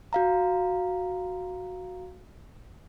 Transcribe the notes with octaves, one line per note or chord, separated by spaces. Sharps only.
F#4 F5 A#5